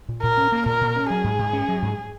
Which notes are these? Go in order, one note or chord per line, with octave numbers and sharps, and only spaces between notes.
A#2
A#2 A#4
C#4
A#3
A#2 A#4
A#2
C#4
F#3 G#4
G#2
G#2
C#4
F#3
G#2